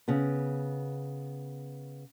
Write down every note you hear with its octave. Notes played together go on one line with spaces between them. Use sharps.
C#3 B3